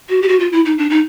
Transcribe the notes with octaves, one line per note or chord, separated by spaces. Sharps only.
F#4
G4
F#4
F4
E4
D#4
D4
D#4